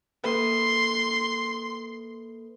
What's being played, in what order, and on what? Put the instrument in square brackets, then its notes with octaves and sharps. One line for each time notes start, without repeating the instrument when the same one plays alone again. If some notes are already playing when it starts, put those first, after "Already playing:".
[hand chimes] A#3 A4 B4 [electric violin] C6